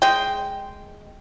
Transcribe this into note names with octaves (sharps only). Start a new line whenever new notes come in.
G#3 G5